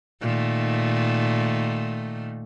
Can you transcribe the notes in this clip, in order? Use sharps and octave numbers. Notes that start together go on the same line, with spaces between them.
A#2 D#3 A3